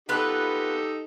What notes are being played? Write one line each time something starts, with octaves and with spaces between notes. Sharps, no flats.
B3 D#4 F4 G4 A4 B4